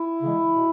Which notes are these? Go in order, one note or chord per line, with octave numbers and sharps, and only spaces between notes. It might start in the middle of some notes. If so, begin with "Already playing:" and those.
Already playing: E4
C#3 E3 G#3
B2